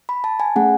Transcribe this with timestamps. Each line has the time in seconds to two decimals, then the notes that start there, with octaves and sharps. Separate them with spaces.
0.09 B5
0.24 A5
0.40 G#5
0.56 A3 C#4 G#4 F#5